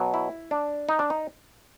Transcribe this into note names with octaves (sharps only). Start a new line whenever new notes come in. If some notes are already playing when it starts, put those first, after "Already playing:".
Already playing: B2 F#3
E4
D4
D#4
D4
D#4